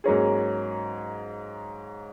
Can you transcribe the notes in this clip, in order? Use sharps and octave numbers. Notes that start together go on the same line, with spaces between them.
G#2 F#3 A#3 C#4 G#4